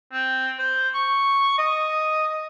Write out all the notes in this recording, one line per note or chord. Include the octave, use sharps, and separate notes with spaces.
C4
C5
C#6
D#5